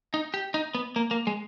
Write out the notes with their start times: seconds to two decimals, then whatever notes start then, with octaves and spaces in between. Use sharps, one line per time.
0.14 D#4
0.34 G4
0.54 D#4
0.75 B3
0.96 A#3
1.11 A#3
1.27 G#3